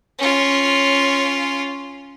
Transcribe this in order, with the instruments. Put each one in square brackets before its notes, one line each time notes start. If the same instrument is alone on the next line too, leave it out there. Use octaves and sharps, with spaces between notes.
[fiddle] C#4 F4